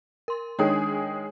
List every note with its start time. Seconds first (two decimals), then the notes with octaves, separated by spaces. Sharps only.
0.28 A#4 C6
0.59 D#3 G#3 D4 G#4 C#5 G5